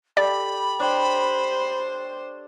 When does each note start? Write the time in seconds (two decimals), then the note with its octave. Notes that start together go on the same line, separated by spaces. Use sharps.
0.17 G4 A4 D5 B5
0.80 D4 C5 C#5 G5